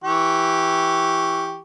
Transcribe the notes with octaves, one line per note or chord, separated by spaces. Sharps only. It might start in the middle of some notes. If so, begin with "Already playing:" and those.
E3 G4 C#6